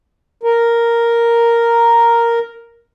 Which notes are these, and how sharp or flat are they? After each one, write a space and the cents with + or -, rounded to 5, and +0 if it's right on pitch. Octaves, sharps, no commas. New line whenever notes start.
A#4 +0